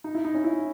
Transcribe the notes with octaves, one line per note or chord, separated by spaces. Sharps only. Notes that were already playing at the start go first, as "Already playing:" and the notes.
D#4
E4
D#4
C#4
E4